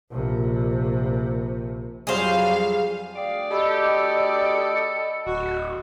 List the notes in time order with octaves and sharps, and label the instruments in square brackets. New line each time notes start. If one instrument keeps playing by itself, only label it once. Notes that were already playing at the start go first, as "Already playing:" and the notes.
[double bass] A#1 C3
[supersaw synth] F2 F#3 G3 [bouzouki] G#4 C5 [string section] F5
[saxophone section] D2 G#4 D5 [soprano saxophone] F5 [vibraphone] G5
[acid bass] G4 [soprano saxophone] A4 [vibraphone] D#5 B5 E6
[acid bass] D1 [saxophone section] F#4